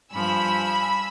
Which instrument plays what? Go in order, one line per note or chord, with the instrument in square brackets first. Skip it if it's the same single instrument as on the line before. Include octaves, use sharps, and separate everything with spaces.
[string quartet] G2 F3 [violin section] G#5 B5 E6